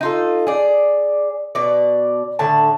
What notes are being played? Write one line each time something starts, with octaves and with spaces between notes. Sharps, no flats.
D#4 F4 A4
G#4 D5
B2 D5
A2 D3 A5